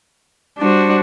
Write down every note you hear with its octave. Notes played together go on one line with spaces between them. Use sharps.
G3 D4 F#4 C5